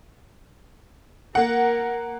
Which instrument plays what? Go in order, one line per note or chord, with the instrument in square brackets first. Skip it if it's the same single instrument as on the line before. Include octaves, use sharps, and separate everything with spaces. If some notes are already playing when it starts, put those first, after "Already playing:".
[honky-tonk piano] A#3 F#5 [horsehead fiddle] A#4